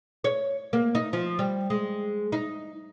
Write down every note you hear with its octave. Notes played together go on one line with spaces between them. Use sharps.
C#5
A#3
D#4
F3
G3
G#3
D#4